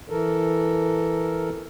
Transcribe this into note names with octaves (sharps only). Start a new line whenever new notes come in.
E3 A4 A#4